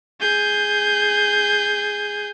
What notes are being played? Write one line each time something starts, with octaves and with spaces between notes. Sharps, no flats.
G#4 G6